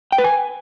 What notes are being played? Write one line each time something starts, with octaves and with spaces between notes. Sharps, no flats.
G5
B4
G#5